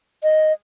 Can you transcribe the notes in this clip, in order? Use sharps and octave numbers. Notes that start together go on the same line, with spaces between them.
D#5